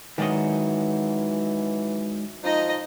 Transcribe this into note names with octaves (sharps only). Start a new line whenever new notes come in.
G#2 D#3 E3 F#3 D5 D#5
F3 D#4 D#5